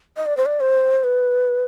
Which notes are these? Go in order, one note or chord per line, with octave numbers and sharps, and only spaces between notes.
D#5
D5
C5
D5
C5
B4